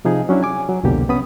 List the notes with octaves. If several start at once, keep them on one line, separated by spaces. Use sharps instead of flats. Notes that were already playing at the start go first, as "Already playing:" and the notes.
C3 F3 D#4 G#4
F#3 C#4 D4 E4
G#5 D6
F#3
C2 F2 B2 D3 A#3 G4
C3 B3 C#4 B5 D#6